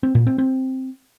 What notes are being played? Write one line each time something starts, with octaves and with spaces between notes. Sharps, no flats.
C4
A#2
C4
C4